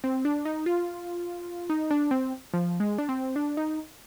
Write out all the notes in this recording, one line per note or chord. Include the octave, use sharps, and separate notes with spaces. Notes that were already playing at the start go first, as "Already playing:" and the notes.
C4
D4
D#4
F4
D#4
D4
C4
F3
G#3
D4
C4
D4
D#4